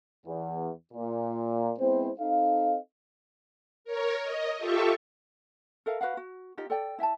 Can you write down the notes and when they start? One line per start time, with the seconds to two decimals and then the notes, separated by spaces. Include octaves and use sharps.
0.27 E2
0.94 A#2
1.79 G#3 B3 C4 E4 C5
2.20 C4 D#4 A4 D#5 F5
3.85 A#4 C#5
4.23 D#5
4.58 F4 G4 A4 E5 C#6
5.86 A4 A#4 E5 F5
6.01 F#4 B4 F5 F#5
6.17 F#4
6.58 D#4 F4 G4 D#5
6.70 A4 D5 G5
6.99 E4 E5 G5 A5